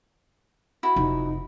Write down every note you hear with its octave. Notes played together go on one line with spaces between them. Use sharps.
E4 F#4
F1 D#4